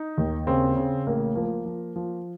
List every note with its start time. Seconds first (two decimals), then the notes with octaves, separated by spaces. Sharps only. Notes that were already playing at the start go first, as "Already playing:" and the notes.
Already playing: D#4
0.18 D#2
0.47 C#3 C4
0.76 C#3
1.07 A1 A#3
1.35 F3 A#3
1.66 F3
1.96 F3